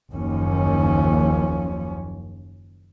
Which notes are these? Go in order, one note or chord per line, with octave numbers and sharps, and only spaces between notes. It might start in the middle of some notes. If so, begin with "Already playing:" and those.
F#1 D#2 F3 C#4